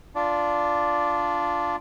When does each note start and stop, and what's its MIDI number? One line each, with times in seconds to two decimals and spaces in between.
0.15 1.76 62
0.15 1.76 65
0.15 1.76 74